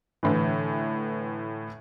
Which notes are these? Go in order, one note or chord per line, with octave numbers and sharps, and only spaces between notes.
A2 D3 E3